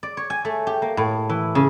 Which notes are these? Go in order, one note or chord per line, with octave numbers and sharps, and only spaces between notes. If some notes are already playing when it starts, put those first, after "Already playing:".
D5
C#5
G#5
A3
G4
A#3
A2
E3
C#3